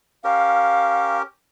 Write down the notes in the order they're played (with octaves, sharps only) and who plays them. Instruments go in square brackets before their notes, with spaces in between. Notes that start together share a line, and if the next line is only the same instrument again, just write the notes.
[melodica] C#4 G4 A#4 [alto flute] F5